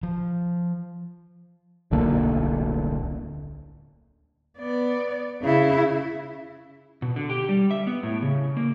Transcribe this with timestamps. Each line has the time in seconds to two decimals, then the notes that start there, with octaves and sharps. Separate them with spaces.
0.03 F3
1.91 D1 B1 D3 A#3
4.58 B3 D5
5.42 C#3 E4
7.02 B2
7.16 D3
7.30 G4
7.49 G3
7.71 E5
7.87 B3
8.03 A2
8.22 C#3
8.57 A#3